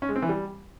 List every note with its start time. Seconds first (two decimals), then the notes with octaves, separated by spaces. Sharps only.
0.02 C#4
0.09 G#3
0.16 C4
0.22 E3
0.29 G3